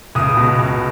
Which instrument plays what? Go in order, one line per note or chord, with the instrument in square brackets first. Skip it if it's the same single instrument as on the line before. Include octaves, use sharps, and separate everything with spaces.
[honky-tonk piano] C#2 D#6
B2
C#2